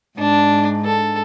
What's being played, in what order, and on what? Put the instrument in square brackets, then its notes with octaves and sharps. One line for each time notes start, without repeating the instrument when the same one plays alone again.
[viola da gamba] G#2 [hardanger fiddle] D4
[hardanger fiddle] A4